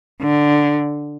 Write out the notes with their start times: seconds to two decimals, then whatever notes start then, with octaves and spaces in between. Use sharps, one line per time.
0.22 D3